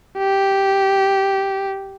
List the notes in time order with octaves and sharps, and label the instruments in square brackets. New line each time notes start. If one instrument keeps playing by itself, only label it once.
[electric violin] G4